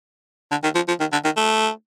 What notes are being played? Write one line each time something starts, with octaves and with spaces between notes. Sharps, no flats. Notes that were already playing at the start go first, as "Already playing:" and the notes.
D3
D#3
F3
F3
D#3
D3
D#3
A3